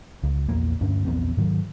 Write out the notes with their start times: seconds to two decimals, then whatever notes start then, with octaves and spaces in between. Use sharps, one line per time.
0.23 C#2
0.48 A#1 E2 A#3
0.81 D2 G2 C#4 D4
1.05 A#1 E2 B3 C4
1.37 G#2 D#3 F#3